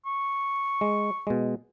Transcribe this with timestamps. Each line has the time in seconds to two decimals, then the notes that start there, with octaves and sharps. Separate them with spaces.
0.06 C#6
0.81 G#3
1.27 B2 G#3